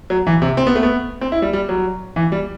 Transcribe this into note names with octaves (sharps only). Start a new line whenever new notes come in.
F#3
E3
C3
C4
B3
A3
B3
C4
E4
G3
G3
F#3
E3
G3